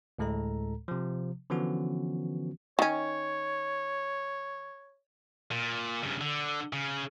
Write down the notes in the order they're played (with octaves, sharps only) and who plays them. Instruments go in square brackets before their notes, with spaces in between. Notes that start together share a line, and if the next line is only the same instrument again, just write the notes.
[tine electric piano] D2 A2 G#3 A4 A#5
C3 F3
D3 E3 F3 B3 C#4 F#4
[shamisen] D#3 C#4 [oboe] C#5
[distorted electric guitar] A#2
G2 C#3
D3
C#3